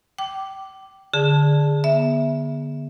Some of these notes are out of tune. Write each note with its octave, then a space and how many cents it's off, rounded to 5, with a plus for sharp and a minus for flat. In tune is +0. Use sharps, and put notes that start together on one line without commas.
G5 -20 D6 +0
D3 +0 G#4 -5 A5 +0
B3 -25 E5 +0